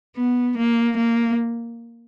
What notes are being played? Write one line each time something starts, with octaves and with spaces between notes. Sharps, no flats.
B3
A#3
A#3